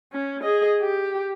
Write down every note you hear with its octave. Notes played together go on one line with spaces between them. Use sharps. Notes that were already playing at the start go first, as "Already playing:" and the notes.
C#4
G#4 D#5
G4